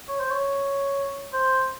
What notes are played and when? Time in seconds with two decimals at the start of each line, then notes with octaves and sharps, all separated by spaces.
0.08 C#5
0.20 C5
0.31 C#5
1.33 C5